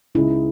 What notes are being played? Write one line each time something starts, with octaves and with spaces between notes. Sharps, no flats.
C#2 C#3 G#3 D#4 E4